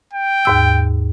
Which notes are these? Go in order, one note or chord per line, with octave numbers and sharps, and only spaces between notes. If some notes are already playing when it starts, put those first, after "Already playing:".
G5
D#2 G#2 E6